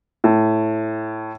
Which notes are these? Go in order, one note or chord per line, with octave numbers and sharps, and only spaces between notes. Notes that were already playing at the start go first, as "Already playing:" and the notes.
A2